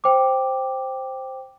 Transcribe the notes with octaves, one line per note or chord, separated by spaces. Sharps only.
C5 G5 D6